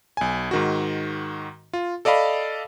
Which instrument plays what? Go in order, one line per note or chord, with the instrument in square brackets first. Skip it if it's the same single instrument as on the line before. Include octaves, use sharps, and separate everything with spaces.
[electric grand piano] B1 G#5
G#2 D#3 F#4
F4
A4 D5 D#5 F5 B5